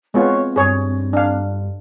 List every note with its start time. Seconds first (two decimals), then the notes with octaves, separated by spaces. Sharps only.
0.14 G#3 B3 C4 F4 C#5
0.56 G2 G#4 C#5
1.13 D4 F5